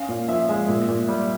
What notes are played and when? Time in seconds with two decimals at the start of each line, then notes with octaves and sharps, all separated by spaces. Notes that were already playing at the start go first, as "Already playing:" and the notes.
Already playing: C#4 F5
0.08 A#2
0.28 F3 E5
0.49 G#3
0.68 A#2
0.88 A#2
1.08 G3